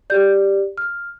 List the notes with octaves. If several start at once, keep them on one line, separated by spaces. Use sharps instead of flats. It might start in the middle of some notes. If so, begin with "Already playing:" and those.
G4 D5 G6
F6